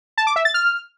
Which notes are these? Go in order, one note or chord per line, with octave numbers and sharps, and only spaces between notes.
A5
D6
E5
A6
F6